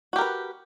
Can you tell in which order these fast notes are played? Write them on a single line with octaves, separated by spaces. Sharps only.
F#4 G4 A#4 B4